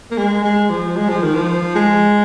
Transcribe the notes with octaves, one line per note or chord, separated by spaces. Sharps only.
A#3
G#3
G#3
F3
G#3
F3
D#3
F3
G#3